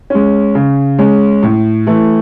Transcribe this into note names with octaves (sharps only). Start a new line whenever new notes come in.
G#3 C#4
C#3
G#3 C#4
A2
E3 A3